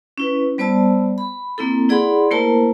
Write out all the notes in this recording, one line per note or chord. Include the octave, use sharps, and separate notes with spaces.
C#4 E4 B4
G3 B3 C5 D5 A5 E6
B5
A#3 C4 E4 A4
E4 G#4 D5 F#5 B5 C6
A3 A#3 E4 A#4 C5 A5